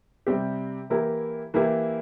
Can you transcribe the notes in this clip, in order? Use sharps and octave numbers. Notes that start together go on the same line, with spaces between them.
C3 G3 C4 G4
E3 A#3 E4 G4 A#4
E3 A#3 E4 G4 A#4